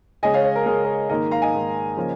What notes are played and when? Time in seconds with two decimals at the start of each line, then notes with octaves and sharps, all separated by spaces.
0.23 C#3 G#3 C#4 D#5 G#5
0.34 C#5 F5
0.44 C#5
0.56 A#4
0.66 C#3 G#3 C#4 A#4
0.85 A#4
1.10 G#2 D#3 A#3 A#4 D#5
1.31 F5 A#5
1.42 D#5 G#5
1.54 G#2 D#3 A#3
1.97 C#3 F3 A#3 C#4